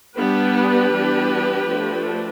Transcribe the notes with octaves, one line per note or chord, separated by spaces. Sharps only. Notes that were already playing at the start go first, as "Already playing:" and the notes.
G3 B3 D4 G4 B4
E3 G3 B3 D4
F3 A3 D4